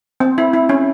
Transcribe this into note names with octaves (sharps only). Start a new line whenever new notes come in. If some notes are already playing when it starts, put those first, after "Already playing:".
C4
E4
E4
C#4